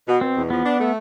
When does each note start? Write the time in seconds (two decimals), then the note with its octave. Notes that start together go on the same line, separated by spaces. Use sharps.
0.08 B2
0.21 B2 C4
0.36 E2
0.50 F3 B3
0.65 D4
0.79 A3